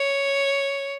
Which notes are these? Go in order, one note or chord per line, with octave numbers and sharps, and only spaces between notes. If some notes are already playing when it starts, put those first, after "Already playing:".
Already playing: C#5